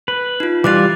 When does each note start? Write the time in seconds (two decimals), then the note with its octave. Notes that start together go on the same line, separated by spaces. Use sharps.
0.08 B4
0.40 D#4 F4
0.64 E3 G3 F4 D6 F#6 A6